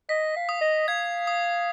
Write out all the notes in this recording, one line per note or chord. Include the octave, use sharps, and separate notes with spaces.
D#5 B6
F5
D#6
D#5
F5 G#6
D#6